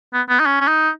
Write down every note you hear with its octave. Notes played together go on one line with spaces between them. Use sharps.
B3
B3
D#4
C#4
C#4
D#4